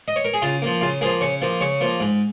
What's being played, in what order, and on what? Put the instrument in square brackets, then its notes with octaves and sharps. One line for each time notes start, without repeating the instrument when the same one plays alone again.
[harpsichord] D#5
C#5
A#4
G#4
C#3 F4
F3 A#3
C#3 F4
F3 A#3 G#4
C#3 C#5
F3 A#3
C#3 C#5
F3 A#3
G#2